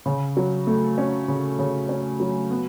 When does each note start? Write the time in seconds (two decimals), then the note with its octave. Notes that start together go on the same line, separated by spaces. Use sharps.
0.06 C#3
0.37 F#3
0.67 A3
0.98 C#4
1.28 C#3
1.59 C#3
1.89 C#4
2.20 F#3
2.51 B3